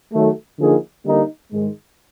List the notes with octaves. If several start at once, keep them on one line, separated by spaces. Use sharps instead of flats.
D#3 F#3 A3
D3 F3 A#3 D#4 G#4
D3 G3 A#3 D#4
G#2 D#3 G#3